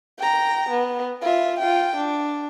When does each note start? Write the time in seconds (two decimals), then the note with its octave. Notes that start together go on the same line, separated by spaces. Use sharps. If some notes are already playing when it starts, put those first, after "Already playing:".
0.18 G5 A#5
0.69 B3
1.21 F4 E5
1.59 F4 G5
1.96 D4